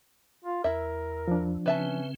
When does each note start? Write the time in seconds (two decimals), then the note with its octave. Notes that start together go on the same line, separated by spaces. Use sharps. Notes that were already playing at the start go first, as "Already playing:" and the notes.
0.45 F4
0.64 E2 E4 A#4 E5
1.28 F3 D4
1.66 C#3 C4 C#4 B4 E5 A5